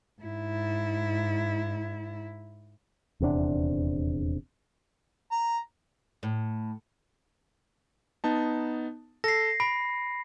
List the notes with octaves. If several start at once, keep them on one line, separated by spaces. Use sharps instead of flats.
G#2 E4
D#1 E2 C3 D4
A#5
A2
B3 D#4 A5
A4 A#6 C7
B5 D7